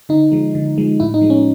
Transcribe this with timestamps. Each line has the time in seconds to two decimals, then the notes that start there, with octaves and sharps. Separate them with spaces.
0.09 D3 D#4
0.32 F3 G#3
0.55 D3
0.78 F3 G#3
1.00 A2 E4
1.14 D#4
1.21 F3 G#3
1.30 C#4